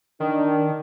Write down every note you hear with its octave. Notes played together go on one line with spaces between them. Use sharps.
D#3 D4